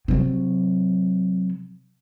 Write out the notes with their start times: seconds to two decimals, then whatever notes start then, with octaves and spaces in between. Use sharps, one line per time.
0.08 C3 F#3